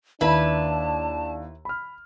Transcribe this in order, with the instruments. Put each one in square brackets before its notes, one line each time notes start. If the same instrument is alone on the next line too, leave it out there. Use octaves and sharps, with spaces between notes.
[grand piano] D#2 [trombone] D4 [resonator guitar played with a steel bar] E4 B4 [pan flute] A5
[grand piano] B5 F6